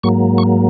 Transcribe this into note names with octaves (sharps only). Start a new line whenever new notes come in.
G#2 F#3 A#3 C#6
C#6